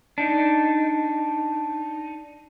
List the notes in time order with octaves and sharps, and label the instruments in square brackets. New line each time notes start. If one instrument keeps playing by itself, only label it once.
[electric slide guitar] D4 D#4